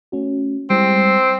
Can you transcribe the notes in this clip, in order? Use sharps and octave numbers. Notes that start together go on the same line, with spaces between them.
A3 C#4 F#4
G3 G#3 C4 E4